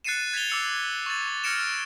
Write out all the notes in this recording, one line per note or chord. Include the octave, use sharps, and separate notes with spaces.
F#6 A6 C7 C#7 D#7 E7
G#6 B6 D#7 F7 G7
D6 E6 C#7
C#6 A6
F6 G#6 A#6 C#7 D7 E7